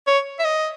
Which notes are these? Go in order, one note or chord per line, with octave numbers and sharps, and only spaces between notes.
C#5
E5
D#5